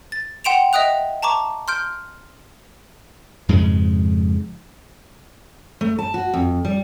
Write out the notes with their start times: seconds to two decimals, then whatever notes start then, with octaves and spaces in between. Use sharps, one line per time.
0.12 A6
0.44 F#5 G5 C6 D7 E7 F7
0.73 D#5 E5 G5 D#6 F#6 F7
1.22 A5 A#5 C#6 D6
1.68 C6 F6 G6 D7
3.49 F2 G#2 C#3 G#3
5.81 A3
5.99 A5
6.14 F#4
6.34 F2
6.65 G3